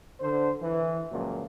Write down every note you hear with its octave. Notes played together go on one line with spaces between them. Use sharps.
D3 C5
E3
C#2 A#2 F3 F#3